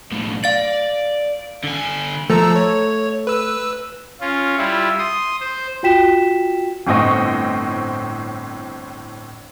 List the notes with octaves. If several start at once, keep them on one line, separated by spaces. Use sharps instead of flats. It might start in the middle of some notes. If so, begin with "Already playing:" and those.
B1 A2
D5 F5 A6
D3 G#5
F3 A3 A#5 E6
C#5
B4 E6
C#4 F4
G3 E4 F4
C6 D#6
C5
F4 F#4 G5 B6 E7
G1 A2 C4 D#5 C#6